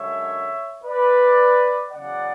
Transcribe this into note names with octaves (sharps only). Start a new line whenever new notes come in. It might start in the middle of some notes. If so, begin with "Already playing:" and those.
Already playing: F#2 D3 G#3 C#5 E5
B4 D5
E2 C#3 F#3 D5 F#5